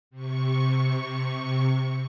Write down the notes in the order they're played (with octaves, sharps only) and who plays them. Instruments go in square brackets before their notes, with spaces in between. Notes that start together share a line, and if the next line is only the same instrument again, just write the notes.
[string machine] C3 C#6